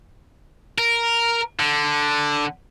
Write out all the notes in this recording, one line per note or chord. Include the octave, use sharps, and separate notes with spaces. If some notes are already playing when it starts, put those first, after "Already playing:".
A#4
D3